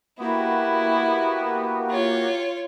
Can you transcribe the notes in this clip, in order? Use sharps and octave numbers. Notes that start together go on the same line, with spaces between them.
A#3 B3 E4 F#4 G4
F4 C#5